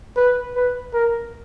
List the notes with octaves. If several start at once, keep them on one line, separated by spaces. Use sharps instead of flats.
B4
B4
A#4